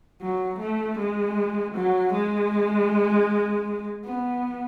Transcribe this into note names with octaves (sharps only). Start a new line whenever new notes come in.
F#3
A3
G#3
F#3
G#3
B3